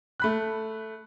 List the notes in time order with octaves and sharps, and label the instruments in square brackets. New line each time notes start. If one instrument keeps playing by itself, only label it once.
[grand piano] A3 B5 F#6